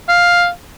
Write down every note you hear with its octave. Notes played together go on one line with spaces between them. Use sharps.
F5